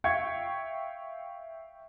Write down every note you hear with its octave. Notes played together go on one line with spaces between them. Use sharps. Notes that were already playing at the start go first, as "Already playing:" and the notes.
E5 F5 G5 C#6 G#6 C#7